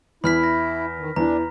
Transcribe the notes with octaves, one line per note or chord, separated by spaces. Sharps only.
E2 E4 B5 F6 B6
A#6
D#3
E2 E3 D4 A#5